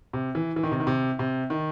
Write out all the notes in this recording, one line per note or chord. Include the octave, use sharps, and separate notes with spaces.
C3
E3
E3
D#3
C3
D#3
C3
C3
D#3